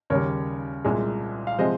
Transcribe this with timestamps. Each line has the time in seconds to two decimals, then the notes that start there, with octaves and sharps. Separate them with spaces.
0.10 D#2 C#3 G3 A#4 C#5
0.85 C2 A#2 G#3
1.47 F5
1.59 C3 F3 G#3 C5 D#5